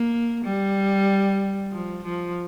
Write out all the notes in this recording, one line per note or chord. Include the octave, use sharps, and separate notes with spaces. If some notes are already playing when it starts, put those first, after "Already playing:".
Already playing: A#3
G3
F3
F3